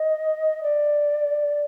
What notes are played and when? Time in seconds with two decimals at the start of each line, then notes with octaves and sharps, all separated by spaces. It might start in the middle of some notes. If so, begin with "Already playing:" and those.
Already playing: D#5
0.63 D5